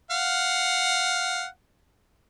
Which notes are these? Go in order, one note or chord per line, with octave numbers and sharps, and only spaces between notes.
F5 F#5